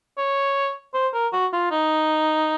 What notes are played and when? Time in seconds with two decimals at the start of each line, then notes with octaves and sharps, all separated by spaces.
0.18 C#5
0.95 C5
1.14 A#4
1.33 F#4
1.53 F4
1.71 D#4